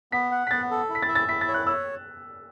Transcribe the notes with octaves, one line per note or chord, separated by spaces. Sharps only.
B3 B6
F#5
B6
B3 A6
A4
E4
B6
A6
E5
A6
E4 B6
A6
C#5
F#6
C#5 E6